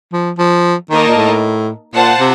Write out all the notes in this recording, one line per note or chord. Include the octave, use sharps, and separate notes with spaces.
F3
F3
D#3 A#3 D#4 A#4 D#5 A5
A#2
A2
A#2 F4 C5 F#5 A5
C3